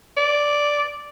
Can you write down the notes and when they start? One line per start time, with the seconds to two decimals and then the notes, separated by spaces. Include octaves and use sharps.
0.17 D5